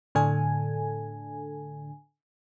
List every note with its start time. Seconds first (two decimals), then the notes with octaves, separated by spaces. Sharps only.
0.15 A2 D3 D4 A4 G#5